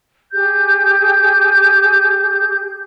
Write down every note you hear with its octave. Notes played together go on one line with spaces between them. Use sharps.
G4 G#4 G6